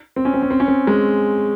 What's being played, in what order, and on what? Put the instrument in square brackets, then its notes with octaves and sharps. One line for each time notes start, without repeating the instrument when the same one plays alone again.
[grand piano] C4
C#4
C4
C#4
C4
C#4
C4
G#3